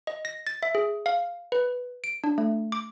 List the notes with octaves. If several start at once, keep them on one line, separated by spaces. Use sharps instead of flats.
D#5
A#6
A6
E5
G#4
F5
B4
D7
D4
A3
D6